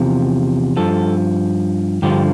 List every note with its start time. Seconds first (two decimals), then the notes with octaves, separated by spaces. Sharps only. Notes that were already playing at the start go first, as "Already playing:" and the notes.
Already playing: E2 C3 F3
0.77 G2 F3 A4
2.02 G2 D3 F3 G4